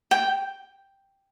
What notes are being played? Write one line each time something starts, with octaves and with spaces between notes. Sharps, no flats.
G5